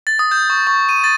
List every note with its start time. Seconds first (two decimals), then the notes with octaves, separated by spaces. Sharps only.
0.07 A6
0.19 D#6
0.31 G6
0.50 C#6
0.67 C#6
0.89 D#7
1.04 A6